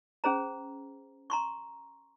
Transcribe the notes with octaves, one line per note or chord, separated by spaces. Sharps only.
C#4 G#4 C5 A#5
A#5 C6 C#6